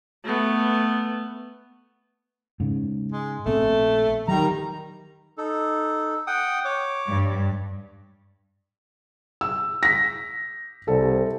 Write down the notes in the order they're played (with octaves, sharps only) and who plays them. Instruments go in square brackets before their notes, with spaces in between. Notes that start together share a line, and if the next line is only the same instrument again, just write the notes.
[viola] A3 B3
[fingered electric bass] G#2 C#3
[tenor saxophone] G#3
[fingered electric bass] A#1 B3 C4 [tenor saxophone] A3
[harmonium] D#3 A#5 [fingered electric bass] F#3 [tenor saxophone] G3
[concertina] D#4 A4
F#5 G5 D#6
C#5 D6
[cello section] G2
[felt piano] E6
A#6 B6
[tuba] C2 [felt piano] A4